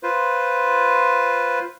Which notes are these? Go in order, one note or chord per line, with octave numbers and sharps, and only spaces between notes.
F4 B4 C5